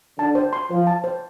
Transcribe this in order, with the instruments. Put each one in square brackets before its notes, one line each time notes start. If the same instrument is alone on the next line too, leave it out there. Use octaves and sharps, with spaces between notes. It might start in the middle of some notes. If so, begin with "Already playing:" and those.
[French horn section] D3 [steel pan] A5
[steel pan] C5
C6
[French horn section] F3 [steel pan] C5
[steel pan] A5
C5